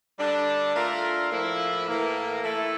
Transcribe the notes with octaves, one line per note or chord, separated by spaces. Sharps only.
D3 G3 D4
A3 D4 F4 A#4
A2 F3 A#3 E4
A2 E3 A#3
E3 A3 E4 A4